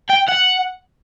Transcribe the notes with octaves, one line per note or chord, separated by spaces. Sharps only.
G5
F#5